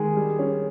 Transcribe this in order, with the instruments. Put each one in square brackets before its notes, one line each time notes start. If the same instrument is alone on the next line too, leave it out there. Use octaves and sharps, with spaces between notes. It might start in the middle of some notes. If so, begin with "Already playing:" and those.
Already playing: [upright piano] D#3 G#3 [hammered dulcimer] G#4
[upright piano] G3
C#4